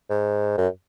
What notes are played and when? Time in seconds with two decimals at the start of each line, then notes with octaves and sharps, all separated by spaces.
0.09 G#2
0.58 F#2